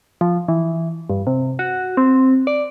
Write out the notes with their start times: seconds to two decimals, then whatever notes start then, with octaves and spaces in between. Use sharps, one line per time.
0.21 F3
0.48 E3
1.10 G2
1.27 C3
1.59 F#4
1.97 C4
2.47 D5